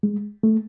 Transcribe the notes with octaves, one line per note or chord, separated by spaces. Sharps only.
G#3
A3